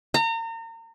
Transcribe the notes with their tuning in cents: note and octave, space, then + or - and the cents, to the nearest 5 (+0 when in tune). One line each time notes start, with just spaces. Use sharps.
A#5 -35